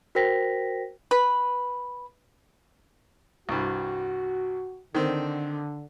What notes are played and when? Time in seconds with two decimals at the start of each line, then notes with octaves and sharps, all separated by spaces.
0.15 F#4 A#4 C5 G5 A#6 B6
1.11 B4
3.49 C2 G2 F#4
4.95 D3 D#3 C4